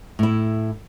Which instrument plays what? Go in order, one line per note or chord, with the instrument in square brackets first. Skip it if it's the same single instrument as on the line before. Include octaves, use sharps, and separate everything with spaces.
[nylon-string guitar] A2 E4